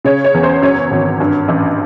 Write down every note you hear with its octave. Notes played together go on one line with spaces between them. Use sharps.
C#3 C#5
C#5
E2
C5
F#2 C#5
G#1
G2
A1